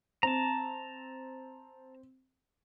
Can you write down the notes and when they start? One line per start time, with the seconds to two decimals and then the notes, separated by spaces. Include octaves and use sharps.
0.23 C4 A5 A#5